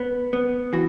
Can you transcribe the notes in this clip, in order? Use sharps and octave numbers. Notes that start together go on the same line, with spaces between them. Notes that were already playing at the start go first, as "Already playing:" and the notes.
Already playing: B3
B3
E3 F#4